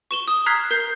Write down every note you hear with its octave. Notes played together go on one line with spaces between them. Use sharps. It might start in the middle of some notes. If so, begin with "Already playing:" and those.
C#6 E7 G7
D#6
A#5 F6 F#6 G#6 B6 C7
A#4 G6 C7